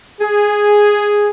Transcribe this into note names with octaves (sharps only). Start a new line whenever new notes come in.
G#4